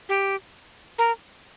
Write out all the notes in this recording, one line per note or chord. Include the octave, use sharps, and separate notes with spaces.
G4
A#4